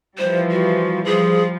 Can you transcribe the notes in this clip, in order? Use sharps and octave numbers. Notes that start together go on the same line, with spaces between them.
E3 F3 G3 C5
F#4
F3 G3 G#4